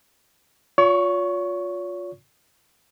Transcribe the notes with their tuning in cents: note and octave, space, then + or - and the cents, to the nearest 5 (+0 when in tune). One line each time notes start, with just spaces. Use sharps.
F4 +25 C#5 +40 C#6 +0